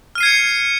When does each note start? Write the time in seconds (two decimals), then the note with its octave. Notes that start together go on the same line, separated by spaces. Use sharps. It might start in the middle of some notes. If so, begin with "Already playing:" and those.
0.15 F6
0.18 D#7
0.20 C7
0.23 G#6
0.25 C#7